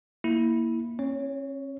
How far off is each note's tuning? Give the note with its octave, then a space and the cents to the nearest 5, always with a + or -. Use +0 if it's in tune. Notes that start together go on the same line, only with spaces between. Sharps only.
A#3 +5 E4 -10
C#4 -40 C#5 +10